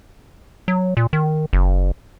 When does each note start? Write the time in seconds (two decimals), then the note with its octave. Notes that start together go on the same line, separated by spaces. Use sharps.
0.68 F#3
0.97 A#2
1.13 D#3
1.53 F#1